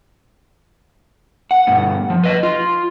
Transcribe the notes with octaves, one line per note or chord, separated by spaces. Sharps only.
F#5
G2 B2
F3
B4 D#5
F4